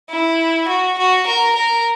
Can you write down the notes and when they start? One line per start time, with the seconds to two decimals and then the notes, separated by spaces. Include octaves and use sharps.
0.10 E4
0.68 F#4
0.98 F#4
1.27 A#4
1.55 A#4